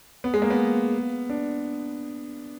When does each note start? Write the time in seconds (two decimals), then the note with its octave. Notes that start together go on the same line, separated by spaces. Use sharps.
0.24 B3
0.34 G#3
0.42 A#3
0.50 B3
1.30 D4